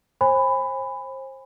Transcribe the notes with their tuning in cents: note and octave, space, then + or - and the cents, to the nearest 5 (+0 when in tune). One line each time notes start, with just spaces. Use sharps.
C5 +30 G#5 -25 B5 +15